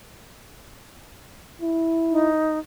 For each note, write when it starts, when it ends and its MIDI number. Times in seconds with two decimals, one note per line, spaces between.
1.62 2.31 64
2.11 2.59 63